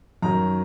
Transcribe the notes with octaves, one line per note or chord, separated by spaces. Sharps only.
F#2 D#3 F#3 A#5